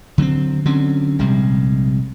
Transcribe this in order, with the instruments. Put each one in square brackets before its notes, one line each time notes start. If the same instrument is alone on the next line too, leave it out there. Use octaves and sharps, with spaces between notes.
[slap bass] D3 F#3 A3 C4
D3 F#3 C4 C#4
A#1 C3 G3 G#3